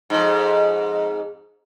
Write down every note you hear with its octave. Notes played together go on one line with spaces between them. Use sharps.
F2 G#2